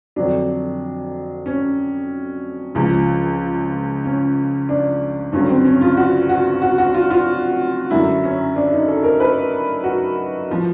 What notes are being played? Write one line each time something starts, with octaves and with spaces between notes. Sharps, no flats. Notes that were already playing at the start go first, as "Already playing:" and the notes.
F2 D3 F#3 D4
C#4
C#2 C#3 F3
C#4
D4
G2 D3 F#3 C#4
C4
C#4
F4
F#4
F#4
F#4
F#4
F4
F4
F#2 D3 F#3 E4
C#4
D4
D#4
A4
A#4
B4
F#4
F3